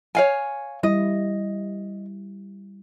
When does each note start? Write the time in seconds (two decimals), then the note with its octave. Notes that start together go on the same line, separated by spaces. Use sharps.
0.15 C#5 F5 G#5
0.83 G3 E4 D#5